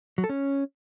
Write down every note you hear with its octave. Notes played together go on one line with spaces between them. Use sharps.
F#3
A4
C#4